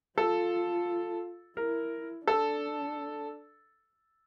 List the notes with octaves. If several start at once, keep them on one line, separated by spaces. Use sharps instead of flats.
F4 A4
E4 A#4
D4 A4